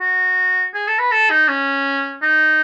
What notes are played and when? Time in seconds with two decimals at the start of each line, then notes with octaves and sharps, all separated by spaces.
0.01 F#4
0.74 G#4
0.88 A4
0.99 B4
1.12 A4
1.31 D#4
1.48 C#4
2.23 D#4